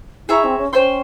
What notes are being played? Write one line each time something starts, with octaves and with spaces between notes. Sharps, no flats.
E4 G#4 E5 A#5 C#6
C4
C#4
C#4 C5 G5 C6